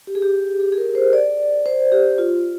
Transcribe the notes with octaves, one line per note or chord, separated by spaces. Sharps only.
G4
G#4
G4
G#4
G#4
A#4
C5
D5
C5
G4
F4